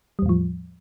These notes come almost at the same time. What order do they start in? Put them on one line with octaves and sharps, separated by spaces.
G3 E2 A2 F3